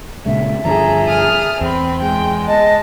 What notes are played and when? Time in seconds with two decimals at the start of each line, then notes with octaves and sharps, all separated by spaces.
0.26 A#2 C#3 G#3 E5
0.65 G2 D3 F3 G#4 A4 A#5
1.08 D#6 F6
1.61 E2 C4 B5
2.01 G#3 G5
2.48 D#5 A5